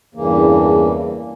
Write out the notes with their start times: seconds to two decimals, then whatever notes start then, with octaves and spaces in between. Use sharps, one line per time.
0.15 E2 G2 C#3 E3 A#3